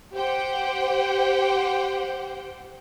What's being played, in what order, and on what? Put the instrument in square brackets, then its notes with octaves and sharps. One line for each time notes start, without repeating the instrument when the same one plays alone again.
[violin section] G4 C5 F#5 G5